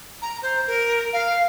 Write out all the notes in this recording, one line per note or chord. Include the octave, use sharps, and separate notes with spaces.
A#5
C5
A#4
F5